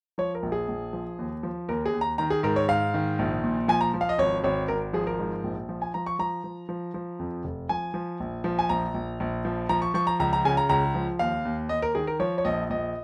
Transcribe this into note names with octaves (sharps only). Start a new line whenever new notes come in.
F3 C#5
A#4
A#1
G#4
A#1
F3
D#2
F3
D#2 A#4
G#4
D#2
A#5
D#3 A#5
G#4
G#2 A#4
C#5
G#2 F5
D#3
A#1
A#2
F3 G#5
A#5
F3
F5
D#5
G#1 C#5
G#1 C#5
G#1 A#4
F3 G#4
A#4
G#2
A#1
F3
G#5
F3 A#5
C#6
F3 A#5
F3
F3
F3
F2
F1
F3 G#5
F3
A#1
F3
G#5
A#1 A#5
A#1
A#1
F3
F3 A#5
C#6
F3 C#6
A#5
C#2 A#5
A#5
C#3 G#5
A#5
C#2 A#5
F3
D#2 F5
D#2
D#2 D#5
A#4
D#3 G#4
A#4
F3 C#5
C#5
A#1 D#5
A#1 D#5